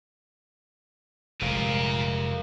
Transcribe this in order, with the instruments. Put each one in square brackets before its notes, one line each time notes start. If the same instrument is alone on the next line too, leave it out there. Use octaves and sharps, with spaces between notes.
[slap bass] F1 G#3 [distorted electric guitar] A#2 [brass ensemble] G3 A#4 [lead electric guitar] A4 F5